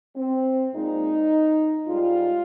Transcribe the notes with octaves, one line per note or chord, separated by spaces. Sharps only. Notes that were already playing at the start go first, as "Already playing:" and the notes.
C4
A#2 G#3 D#4
G#2 G3 F4